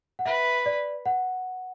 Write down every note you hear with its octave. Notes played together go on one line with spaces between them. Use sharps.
F#5
B4 E5
D5
F#5